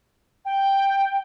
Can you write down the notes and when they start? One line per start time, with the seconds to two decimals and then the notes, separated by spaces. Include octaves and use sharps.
0.45 G5